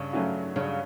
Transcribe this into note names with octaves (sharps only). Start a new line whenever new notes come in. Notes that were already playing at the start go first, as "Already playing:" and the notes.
Already playing: G2 C#3
F#3 A3 C#4 F#4
G2 C#3